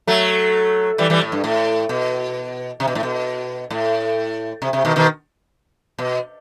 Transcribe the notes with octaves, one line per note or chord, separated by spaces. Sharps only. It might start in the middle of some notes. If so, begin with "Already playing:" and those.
F#3 A3
E3 G3
E3 G3
A2
G2
A2
B2
C3
B2
A2
B2
A2
C3
C3
B2 D#3
B2 D#3
B2